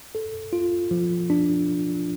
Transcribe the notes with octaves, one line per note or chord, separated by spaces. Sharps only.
A4
F4
F3
D4